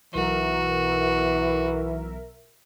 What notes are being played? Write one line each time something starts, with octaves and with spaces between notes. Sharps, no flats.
B1 E3 F#4 A#4 E5